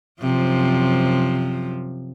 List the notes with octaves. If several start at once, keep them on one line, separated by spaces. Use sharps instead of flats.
F#2 C3 F3